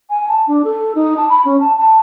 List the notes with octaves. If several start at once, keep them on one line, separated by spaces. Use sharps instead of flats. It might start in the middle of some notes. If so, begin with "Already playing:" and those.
G#5
A5
D4
A4
D#4
A5
B5
C#4
A5
A5